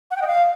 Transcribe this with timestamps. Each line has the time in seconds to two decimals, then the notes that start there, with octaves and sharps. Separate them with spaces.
0.11 F#5
0.16 G5
0.22 D#5
0.27 F5